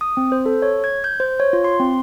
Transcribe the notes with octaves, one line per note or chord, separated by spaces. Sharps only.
D#6
C4
C5
A4
C#5
G#6
G6
C5
C#5
F4
C6
C4